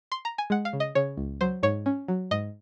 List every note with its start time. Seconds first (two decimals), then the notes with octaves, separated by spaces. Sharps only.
0.12 C6
0.25 A#5
0.38 G#5
0.50 G#3 F#5
0.65 F5
0.73 C#3
0.80 D#5
0.95 C#3 C#5
1.17 C#2
1.41 F#3 C5
1.63 G#2 C#5
1.86 C#4
2.08 F#3
2.31 G#2 D#5